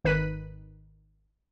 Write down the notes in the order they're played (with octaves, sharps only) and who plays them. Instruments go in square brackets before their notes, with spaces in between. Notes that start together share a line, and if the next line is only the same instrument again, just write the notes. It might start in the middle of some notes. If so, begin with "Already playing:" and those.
[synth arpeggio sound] G#1 D#3 B4 F#6 B6 D#7